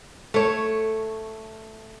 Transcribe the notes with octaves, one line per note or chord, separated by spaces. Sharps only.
A3 C#5